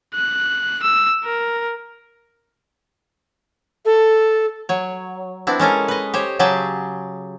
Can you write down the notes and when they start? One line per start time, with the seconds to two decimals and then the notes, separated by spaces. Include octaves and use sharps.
0.15 F#6
0.83 E6
1.24 A#4
3.85 A4
4.69 F#3 C#5
5.47 B3 C4 D4 E4
5.60 G#3 C#4 A4 A#4
5.88 B4 D#5
6.14 G4 C5 C#5
6.39 C#3 F#3 G4 G#4 G5 A5